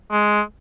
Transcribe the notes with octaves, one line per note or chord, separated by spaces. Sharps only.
G#3